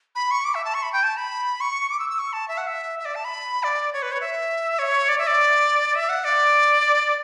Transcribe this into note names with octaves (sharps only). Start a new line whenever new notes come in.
B5
C#6
D6
E5
A5
C#6
B5
G5
A5
B5
C#6
D6
E6
E6
C#6
A5
E5
F#5
E5
E5
D5
A5
B5
D5
C#5
B4
C#5
E5
C#5
D5
E5
D5
E5
F#5
D5